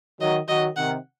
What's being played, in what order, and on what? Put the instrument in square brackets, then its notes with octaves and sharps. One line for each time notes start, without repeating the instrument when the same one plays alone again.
[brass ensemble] D#3 F#3 [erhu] D#5
[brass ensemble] D#3 F#3 [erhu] D#5
[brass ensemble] C3 D#3 [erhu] F#5